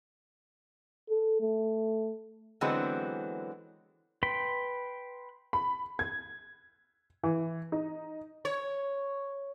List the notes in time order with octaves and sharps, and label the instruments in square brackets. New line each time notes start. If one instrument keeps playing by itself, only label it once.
[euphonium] A4
A3
[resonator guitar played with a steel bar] D3 E3 F#3 G#3 B3 C4
[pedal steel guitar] B4 G5 B5 C6
[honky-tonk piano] B5
G#6
E3
D#4
[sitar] C#5